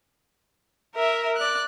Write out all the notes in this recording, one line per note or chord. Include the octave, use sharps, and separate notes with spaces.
A#4 E5
D5 F#6